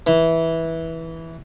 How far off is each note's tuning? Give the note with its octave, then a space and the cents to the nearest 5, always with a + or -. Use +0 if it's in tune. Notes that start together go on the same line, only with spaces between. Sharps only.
E3 -10